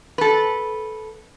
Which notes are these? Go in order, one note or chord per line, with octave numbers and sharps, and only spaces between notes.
A4 B4